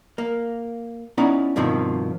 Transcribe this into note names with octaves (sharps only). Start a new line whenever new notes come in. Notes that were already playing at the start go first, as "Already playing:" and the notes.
A#3
B3 C#4 D#4 E4 D5 A#5
G2 B2 D#3 F3 C4